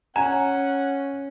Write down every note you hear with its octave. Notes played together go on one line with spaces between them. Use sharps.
C#4 F#5 G#5 A#5